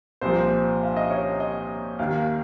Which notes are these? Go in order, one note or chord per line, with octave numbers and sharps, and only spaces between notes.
C2 A#2 F3 C5
F5
D#5
C#5
D#5
D#2 D#3 F5